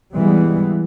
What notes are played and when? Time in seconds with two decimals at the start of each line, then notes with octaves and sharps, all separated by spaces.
0.17 E3 G3 G#3 B3